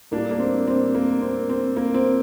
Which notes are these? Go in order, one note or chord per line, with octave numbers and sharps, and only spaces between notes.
A2 G3 A#3 D4
A#3
C4
C4
A#3
C4
C4
A#3
C4